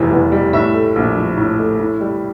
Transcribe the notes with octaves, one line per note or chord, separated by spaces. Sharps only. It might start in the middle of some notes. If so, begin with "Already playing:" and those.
Already playing: F1 E2 E3 G3
E2
G3
A2 E5
A3
A#1
F3
A2
A3
A2
G3